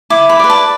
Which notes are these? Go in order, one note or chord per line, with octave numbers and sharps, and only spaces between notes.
E4 D6
B5
B4 D5
A5